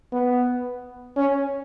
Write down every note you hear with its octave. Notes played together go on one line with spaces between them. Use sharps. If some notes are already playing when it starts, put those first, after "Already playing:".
B3
C#4